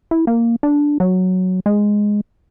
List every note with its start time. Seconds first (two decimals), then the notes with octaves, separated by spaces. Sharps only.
0.11 E4
0.27 A#3
0.63 D4
1.00 F#3
1.66 G#3